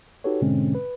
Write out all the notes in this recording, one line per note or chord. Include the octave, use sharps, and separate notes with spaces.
D#4 F#4 G4 A4 B4 C#5
G#2 B2 D3 G#3 C4 C#4
B4